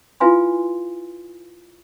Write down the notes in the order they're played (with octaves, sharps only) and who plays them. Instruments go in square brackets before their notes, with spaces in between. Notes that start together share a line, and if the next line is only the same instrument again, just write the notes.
[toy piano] E4 F4 B4 F5 G#5 C6